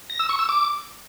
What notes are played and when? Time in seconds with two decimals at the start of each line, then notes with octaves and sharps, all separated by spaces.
0.10 A#6
0.19 E6
0.29 C#6
0.39 E6
0.49 D6